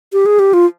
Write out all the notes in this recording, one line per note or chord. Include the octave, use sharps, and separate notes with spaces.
G4
G#4
G4
F4